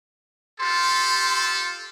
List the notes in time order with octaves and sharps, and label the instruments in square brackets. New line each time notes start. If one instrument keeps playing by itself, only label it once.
[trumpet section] F4 G4 A4 [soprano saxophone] C6